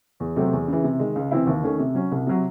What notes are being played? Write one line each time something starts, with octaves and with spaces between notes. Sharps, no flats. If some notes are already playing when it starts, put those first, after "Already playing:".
E2
C3 F#3 A3 C4
E2
C#3 E3
C3
D#3 G#3
C#2
C3 E3 C4 E4
D#2
D#3 A3 C#4
C3
F#3 C#4
C2
C3 F#3